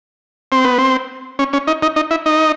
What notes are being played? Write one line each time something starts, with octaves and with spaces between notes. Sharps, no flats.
C4
B3
C4
C#4
C#4
D#4
D#4
D#4
E4
D#4